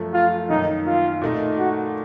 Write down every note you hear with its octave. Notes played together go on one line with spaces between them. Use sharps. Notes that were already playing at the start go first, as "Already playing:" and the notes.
Already playing: F#2 F3 A3
F4
F#2 D#3 A#3 D#4
F4
A#2 A3 D#4
F#4